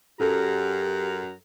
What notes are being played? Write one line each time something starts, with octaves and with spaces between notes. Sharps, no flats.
F#2 G4 A4 A#5